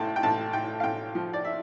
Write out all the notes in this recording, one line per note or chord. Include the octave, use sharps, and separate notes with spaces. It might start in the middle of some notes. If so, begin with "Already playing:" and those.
Already playing: A1 A2 G5 A5
G5
A1 A5
A2 G5
F5
A1 G5
F3
D5
E5